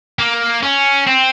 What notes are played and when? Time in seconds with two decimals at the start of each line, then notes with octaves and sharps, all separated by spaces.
0.19 A#3
0.63 C#4
1.07 C4